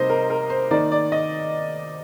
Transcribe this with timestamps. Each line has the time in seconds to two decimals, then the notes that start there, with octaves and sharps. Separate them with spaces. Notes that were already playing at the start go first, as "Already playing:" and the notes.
Already playing: C3 G3 A#3 D#4 C5 D#5
0.10 A#4
0.30 A#4
0.50 C5
0.71 D#3 A#3 D#4 D5
0.92 D5
1.12 D#5